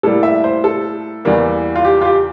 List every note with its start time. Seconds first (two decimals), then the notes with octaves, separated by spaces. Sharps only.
0.03 A2 G3 A#3 A4
0.23 E5
0.44 C5
0.64 A4
1.25 E2 E3 G3 A#3
1.76 F4
1.85 G4
2.01 F4
2.05 G4